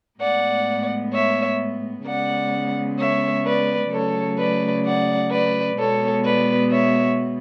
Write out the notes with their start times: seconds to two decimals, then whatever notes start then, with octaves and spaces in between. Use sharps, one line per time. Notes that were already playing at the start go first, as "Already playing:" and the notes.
0.20 A2 G#3 B3 D5 F#5
1.13 C#5 E5
2.06 C#3 G#3 B3 D5 F#5
2.99 C#5 E5
3.45 B4 D5
3.92 C#3 F#3 A3 A4 C#5
4.39 B4 D5
4.85 D5 F#5
5.31 B4 D5
5.78 B2 G#3 B3 A4 C#5
6.25 B4 D5
6.71 C#5 E5